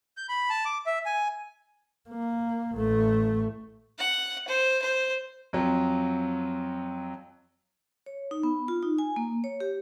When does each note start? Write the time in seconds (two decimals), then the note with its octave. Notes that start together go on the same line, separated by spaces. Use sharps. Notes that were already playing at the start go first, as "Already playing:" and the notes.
0.17 G6
0.29 B5
0.50 A5
0.65 D6
0.86 E5
1.06 G#5
2.10 A#3
2.74 A1 A3
3.99 F#5
4.48 C5
4.81 C5
5.53 F2 F#3
8.06 C#5
8.31 D#4
8.43 B3
8.68 F4
8.83 D#4
8.98 G#5
9.16 A#3
9.44 C#5
9.60 G4